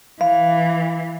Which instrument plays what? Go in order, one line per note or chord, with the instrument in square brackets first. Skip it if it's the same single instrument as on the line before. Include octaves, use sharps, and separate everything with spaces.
[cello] E3 [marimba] F5